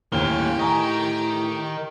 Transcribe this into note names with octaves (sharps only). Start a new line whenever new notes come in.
D#2 A2 A#3 C#4 G4 F6 G7
A#4 D#5 G#5 A#5 C#6